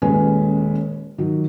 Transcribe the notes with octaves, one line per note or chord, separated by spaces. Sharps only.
D#1 G#3 C#4 B4
D#3 F#3